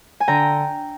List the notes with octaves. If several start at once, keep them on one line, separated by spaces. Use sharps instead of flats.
G#5
D3 G5 A#5